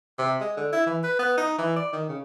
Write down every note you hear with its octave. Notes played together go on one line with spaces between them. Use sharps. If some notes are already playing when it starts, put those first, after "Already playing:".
C3
G#3
D3
E4
E3
B4
B3
D#4
E3
D5
D#3
C#3